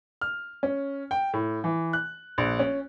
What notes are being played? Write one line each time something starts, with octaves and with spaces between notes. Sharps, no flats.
F6
C#4
G5
A2
E3
F#6
A#1
C#4